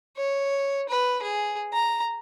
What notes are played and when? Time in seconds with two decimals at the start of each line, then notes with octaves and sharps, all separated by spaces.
0.17 C#5
0.89 B4
1.22 G#4
1.73 A#5